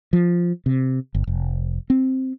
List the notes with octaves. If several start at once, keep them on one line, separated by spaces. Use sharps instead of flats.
F3
C3
G1
F1
C4